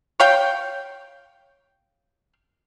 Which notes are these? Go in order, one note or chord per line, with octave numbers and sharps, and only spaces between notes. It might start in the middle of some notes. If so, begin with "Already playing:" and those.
C#5 F5 G5